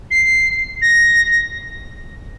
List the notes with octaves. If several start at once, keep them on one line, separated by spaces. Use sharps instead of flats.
C7
A#6